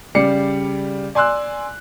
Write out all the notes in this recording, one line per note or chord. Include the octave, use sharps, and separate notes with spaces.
C#3 G3 D5 C7 C#7
D5 G#5 C6 E6 F#6